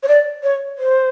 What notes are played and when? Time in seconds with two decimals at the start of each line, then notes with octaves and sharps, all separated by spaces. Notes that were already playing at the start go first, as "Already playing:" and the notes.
0.03 C#5
0.08 D5
0.43 C#5
0.78 C5